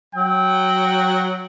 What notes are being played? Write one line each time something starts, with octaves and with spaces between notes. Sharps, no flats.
F#3 G5